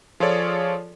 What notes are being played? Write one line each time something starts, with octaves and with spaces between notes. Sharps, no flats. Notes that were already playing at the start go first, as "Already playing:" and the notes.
F3 F4 G#4 A4 C#5 D5